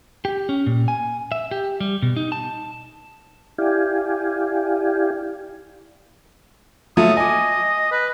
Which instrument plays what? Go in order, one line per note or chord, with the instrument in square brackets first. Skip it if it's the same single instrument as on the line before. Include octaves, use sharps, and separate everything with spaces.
[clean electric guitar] G4
C#4
A#2
G#5
E5
G4
G3
B2
D#4
A5
[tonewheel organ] E4 G4 D5 F5 G5 G#5
[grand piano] F#3 A3 F4 [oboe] D#6
[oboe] D#5 [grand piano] G#5 D6
[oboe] B4